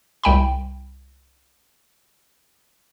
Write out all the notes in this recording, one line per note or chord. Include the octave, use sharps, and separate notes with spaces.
C2 G5 B5